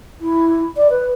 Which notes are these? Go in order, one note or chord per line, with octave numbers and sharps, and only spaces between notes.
E4
D5
B4